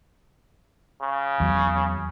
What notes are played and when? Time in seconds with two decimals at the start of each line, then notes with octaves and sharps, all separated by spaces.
1.01 C#3
1.40 E2 F#3